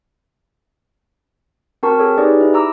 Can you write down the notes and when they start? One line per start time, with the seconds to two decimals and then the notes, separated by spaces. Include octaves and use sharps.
1.83 C4 F#4 A#4 A5 C#6
1.99 G#4 A4 C#5
2.18 D#4 G4 G#4 B4 D5
2.41 E4
2.54 A#5 D6 E6